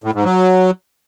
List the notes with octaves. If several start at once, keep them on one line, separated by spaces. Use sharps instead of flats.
A2
G#2
F#3